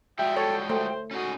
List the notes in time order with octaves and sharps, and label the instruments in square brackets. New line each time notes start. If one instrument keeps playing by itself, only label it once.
[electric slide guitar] F3 G3 G#3 [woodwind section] F#4 G5 [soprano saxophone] E5
[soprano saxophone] A4 [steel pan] C#5
[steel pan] A3 [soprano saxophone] C5
[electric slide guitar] C#4 D#4 G#4 [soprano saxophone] F#4